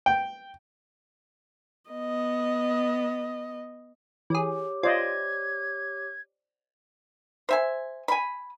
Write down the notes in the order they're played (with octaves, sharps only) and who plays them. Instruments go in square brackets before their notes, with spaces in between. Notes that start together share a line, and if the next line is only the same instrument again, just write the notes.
[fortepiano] G5
[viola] B3 D#5
[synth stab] E3 G#4 [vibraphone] G4 C#5 D6
[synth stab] F4 [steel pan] C5 D5 D#5 [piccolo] G#6
[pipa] C5 E5 G#5
G#5 B5